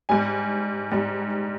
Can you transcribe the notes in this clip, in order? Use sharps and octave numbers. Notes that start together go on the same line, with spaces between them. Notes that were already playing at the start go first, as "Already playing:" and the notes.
G#2 G3 G#5
G#2 G3